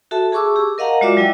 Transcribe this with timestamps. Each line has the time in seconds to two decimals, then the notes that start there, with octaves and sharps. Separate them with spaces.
0.11 F#4 A4 E5 A5
0.32 G#4 A5 C#6 D6 E6
0.56 G4
0.78 A#4 D#5 F5 F#5 A#5
1.01 G#3 F4 F#4 D5 E5 D6
1.17 F#3 E4 D#5 G5